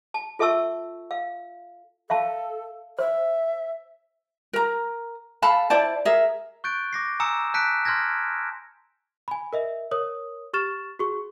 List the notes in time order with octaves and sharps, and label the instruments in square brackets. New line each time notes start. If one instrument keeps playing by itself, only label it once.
[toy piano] A5
F4 A4 E5 A5 C#6 E6
F5
[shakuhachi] A4 [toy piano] E5 F5 A5
[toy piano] C5 [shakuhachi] E5
[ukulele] A#4 A#5
A4 F5 A5 B5
E4 C5 D5 A5
G#4 A#4 E5
[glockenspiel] C#6 F#6 G6 A6 D7
D6 A#6 C7
G#5 A#5 D#6 E6 C#7 E7
A5 F#6 G6 B6 C#7 D7
C6 F6 G6 G#6 A#6
[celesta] G#5 B5
A#4 D#5 E5
A#4 C#5 D#6
G4 C#6 F6 A6 E7
F#4 G#4 C#6